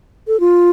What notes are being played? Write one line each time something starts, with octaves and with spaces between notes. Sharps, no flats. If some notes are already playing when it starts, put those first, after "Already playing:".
A4
F4